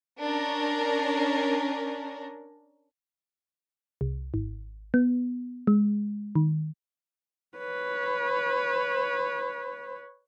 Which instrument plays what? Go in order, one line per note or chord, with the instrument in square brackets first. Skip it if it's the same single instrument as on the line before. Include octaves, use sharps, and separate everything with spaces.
[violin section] C#4 D4 A#4
[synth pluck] C2
G#1
B3
G#3
D#3
[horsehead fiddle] B4 C#5